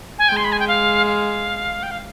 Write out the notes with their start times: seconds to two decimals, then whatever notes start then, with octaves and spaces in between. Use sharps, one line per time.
0.18 G#5
0.29 G#3 G5
0.36 C6
0.44 B5
0.52 G#5
0.59 G5
0.68 F5
1.06 F5
1.83 G5
1.91 F5